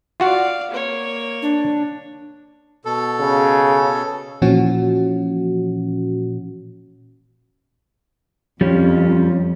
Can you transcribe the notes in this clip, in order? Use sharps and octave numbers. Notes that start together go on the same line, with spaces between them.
F4 F#4 D5 F5 F#5
A#3 C#5
D4
B2 A4
C#3
A#2 E3 F3 C#4 F#4
F2 F3 G3 C#4